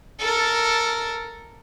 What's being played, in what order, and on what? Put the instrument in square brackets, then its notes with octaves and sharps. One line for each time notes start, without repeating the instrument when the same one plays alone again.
[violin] A4 A#4